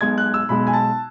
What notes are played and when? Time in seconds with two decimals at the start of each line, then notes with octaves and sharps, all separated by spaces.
0.01 B1 B2 G#3 G#6
0.18 F#6
0.34 E6
0.49 B1 B2 G#3 B5
0.67 G#5
0.73 A5